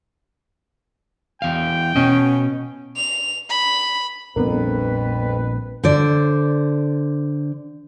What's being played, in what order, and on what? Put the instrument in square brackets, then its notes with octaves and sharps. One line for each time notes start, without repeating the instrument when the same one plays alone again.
[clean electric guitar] E2 F5 [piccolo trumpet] G5
[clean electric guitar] B2 D#5 [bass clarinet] C#4
[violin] F7
B5
[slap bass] A#1 G3 D4 [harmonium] F2 [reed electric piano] B3 A#4 [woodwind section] B4
[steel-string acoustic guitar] D3 C5 D5